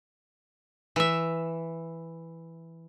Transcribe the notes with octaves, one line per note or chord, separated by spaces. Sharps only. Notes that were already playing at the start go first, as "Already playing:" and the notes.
E3 E5